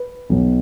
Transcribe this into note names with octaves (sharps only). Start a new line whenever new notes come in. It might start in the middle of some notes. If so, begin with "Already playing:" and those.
Already playing: B4
B1 B2 F#3 B3